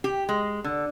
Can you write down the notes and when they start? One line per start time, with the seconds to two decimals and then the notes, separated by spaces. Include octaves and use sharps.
0.04 G4
0.29 G#3
0.64 D3